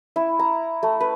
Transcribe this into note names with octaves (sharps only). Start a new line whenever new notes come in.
E4
A#5
A3
B4